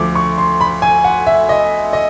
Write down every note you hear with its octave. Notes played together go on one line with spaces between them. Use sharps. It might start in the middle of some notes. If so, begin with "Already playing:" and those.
Already playing: D2 D3 F3 A3 D6
C#6
C6
B5
G#5
F#5
E5
D#5
D#5